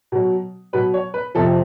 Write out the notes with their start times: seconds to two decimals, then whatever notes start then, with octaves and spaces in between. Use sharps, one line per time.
0.12 B2 F#3
0.73 B2 F#3 B4
0.94 C#5
1.14 B4
1.35 F2 C3 F3 A4